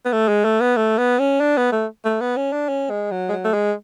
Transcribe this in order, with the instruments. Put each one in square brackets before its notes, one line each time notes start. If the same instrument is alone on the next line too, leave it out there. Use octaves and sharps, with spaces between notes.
[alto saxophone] B3
A3
G#3
A3
B3
A3
B3
C#4
D4
B3
A3
A3
B3
C#4
D4
C#4
G#3
F#3
G#3
F#3
A3
G#3